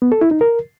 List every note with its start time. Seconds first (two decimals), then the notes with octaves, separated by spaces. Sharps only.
0.02 B3
0.12 A4
0.21 E4
0.31 D#4
0.41 A#4